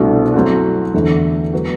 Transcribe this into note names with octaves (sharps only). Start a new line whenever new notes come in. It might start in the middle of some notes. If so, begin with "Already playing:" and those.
Already playing: C2 B2 A3 D4 F#4
F#3 A3 C4 F#4
E2 D3 A3 E4
F#3 B3 F#4